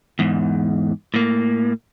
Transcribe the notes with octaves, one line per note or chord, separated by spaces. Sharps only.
E2 G#2
A2 A#3